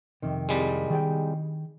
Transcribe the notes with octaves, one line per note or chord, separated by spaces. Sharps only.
F2 C3 D#3
C2 G3 G#3
D#3 G#4 G5